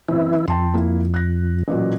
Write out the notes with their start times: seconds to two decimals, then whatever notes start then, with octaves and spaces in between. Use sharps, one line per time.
0.09 F#1 E3 C4 E4
0.48 F2 G5 A5 C6
0.74 A#3 E4
1.14 F#6 A#6
1.68 A1 A#2 F#3